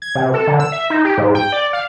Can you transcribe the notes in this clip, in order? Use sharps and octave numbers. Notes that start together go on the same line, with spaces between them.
G#6
C3
A4
D3
E6
E5
D#4
G4
G#2
G5
D5
F5